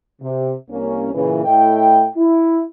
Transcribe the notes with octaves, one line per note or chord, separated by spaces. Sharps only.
C3
C2 A#3 C#4
A#2 C#3 E3
A2 A3 E4 D#5 G5
E4